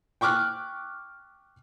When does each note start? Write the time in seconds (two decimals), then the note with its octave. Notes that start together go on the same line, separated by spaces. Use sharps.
0.21 G5 C#6 D6 F6 F#6